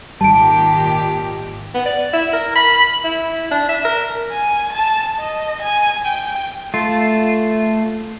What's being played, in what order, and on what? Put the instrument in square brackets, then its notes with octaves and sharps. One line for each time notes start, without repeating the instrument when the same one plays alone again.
[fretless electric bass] G#1 G3 [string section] A#2 D#3 G4 [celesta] A5 D7
[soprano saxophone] B3
D5
E4
A#4
B5
B5
E4
D4
E5
A#4
[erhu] G#5
A5
D#5
G#5
G5
[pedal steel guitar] A3 F4